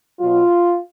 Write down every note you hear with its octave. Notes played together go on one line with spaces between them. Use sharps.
B2 F#3 F4